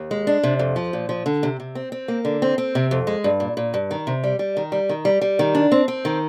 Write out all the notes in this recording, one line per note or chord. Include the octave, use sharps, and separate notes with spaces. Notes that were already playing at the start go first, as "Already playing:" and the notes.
Already playing: D#2
G#3
D4
C3
F2
F3
A#2
F3
D3
C3
C3
C4
C4
A#3
D3
C4
C4
C3
F2
G#3
G2
A#2
A#2
G2
D#3
C3
G3
G3
D#3
G3
D#3
G3
G3
D#3
D4
C4
C4
D#3